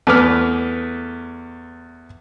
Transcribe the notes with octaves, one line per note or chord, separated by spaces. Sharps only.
E2 A3 B4 D6 F6